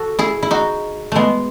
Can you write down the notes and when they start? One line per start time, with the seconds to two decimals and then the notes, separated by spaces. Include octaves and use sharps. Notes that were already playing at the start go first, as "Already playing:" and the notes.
Already playing: F#4 A4
0.19 E4 G#4
0.43 E4
0.51 D#4 F#4
1.12 G#3 A3 B3